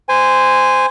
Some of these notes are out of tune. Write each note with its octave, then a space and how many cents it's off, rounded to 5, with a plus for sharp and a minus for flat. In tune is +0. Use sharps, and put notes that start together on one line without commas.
C5 -15 G#5 -15